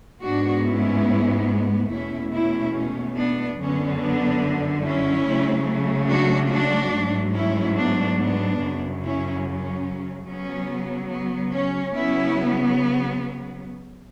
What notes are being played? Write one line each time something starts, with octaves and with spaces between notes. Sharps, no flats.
G#2 G#3 B3 D4 F#4
C#4 E4
E2 B2 A3 C#4 E4
C#4 E4
C#4
B3 D4
F#2 D3 F#3 B3 C#4
B3 D4
C#4 E4
C#3 F#3 A3
D4 F#4
D4 F#4
G#2 F#3 A3
C#4 E4
B3 D4
B3 D4
F#2 C#3 F#3
C#4 E4
C#4
C#3 F#3 B3 C#4
B3
C#4
C#3 F#3 B3 C#4 E4